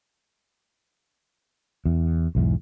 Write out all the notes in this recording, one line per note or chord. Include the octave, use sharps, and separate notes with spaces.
E2
B1 E2 G#2